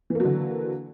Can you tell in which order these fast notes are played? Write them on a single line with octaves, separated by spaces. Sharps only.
E3 A#3 F#3 D3